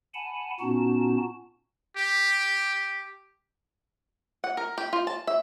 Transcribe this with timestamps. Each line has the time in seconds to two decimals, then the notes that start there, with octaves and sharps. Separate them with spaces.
0.14 F#5 G#5 A5 B5
0.60 A#2 B3 C#4 D#4 F#4 A5
1.97 G4
4.44 F#5
4.57 A#4
4.78 G4
4.93 F4
5.07 A5
5.27 E5